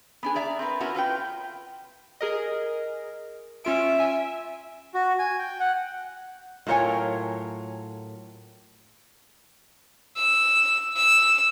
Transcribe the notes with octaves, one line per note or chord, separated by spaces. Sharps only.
B3 D4 G#4
G#4 D5 E5 A#5
C4 A#4 B4
B3 C#4 E4 F#4 A#4
F4 B4 C#5 G5
G#4 A#4 D#5
C#4 F4 E5 D7
G#5
F#4
G#5
G5
F#5
A2 F#3 F4 A#4 C#5 G#5
E6
E6